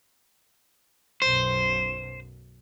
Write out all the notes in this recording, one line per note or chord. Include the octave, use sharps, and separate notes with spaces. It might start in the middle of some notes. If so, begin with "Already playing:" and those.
B1 F#2 B2 C5